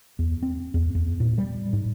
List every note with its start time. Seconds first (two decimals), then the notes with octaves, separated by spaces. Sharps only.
0.19 E2
0.43 C4
0.74 E2
0.95 E2
1.20 A#2
1.38 G3
1.73 G#2